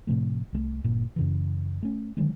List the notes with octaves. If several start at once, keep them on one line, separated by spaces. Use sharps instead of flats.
A2 C3 F3 A3
C2 G#3 A3
G1 A#2
F#2 C#3 E3
A3 C#4
D3 D#3 F#3 G#3